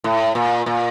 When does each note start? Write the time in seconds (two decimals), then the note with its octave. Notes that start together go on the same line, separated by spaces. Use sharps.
0.04 A2
0.35 A#2
0.66 A#2